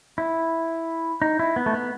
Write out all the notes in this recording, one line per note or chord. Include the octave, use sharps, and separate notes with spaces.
E4
D#4
E4
B3
A3
B3